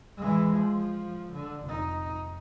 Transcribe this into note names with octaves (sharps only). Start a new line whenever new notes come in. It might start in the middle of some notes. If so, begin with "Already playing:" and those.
E3 G#3
F3
D3
F1 D#4